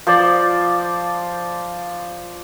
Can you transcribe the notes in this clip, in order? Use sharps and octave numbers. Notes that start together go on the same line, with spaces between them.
F3 C5 D5